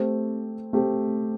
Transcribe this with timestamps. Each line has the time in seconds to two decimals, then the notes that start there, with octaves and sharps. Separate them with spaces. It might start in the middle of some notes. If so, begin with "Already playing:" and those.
Already playing: A3 C4 G4 C5
0.73 A3 C4 G4 C5